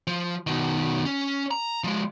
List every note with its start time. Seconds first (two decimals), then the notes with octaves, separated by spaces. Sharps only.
0.07 F3
0.47 B2 D#3
1.05 C#4
1.51 A#5
1.84 F3 G#3